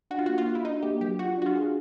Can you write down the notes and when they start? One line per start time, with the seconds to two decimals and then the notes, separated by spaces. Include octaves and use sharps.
0.11 D4 F#4
0.19 F4
0.26 F#4
0.29 A#3
0.38 F4
0.47 F#4
0.55 E4
0.65 D4 D#4
0.83 A#3 G4
1.01 F#3 G4
1.19 F4 F#4
1.38 D4 F#4
1.46 F4
1.56 G#4